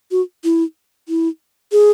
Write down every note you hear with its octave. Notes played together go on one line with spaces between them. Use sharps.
F#4
E4
E4
G#4